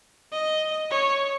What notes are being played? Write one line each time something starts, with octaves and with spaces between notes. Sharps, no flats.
D#5
C#5